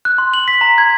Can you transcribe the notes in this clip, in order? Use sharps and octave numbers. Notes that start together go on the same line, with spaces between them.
F#6
C6
F#7
B6
A#5
G#6